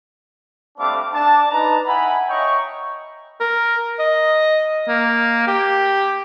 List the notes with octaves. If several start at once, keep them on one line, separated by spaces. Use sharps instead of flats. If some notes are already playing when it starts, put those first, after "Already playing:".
G3 A3 C4 D4 F5 D6
D4 A5
D#4 B4 A#5
E4 F#5 G#5 B5
C#5 D#5 E5 G5 A#5 C#6
A#4
D#5
A#3
G4